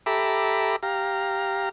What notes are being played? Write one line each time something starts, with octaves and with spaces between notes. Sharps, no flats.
G4 A4 E5 A#5 B5 D6
G4 F5 A#5